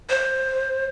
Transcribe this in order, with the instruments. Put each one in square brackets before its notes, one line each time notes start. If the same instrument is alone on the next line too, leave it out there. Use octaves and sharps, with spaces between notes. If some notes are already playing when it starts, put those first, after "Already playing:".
[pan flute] C5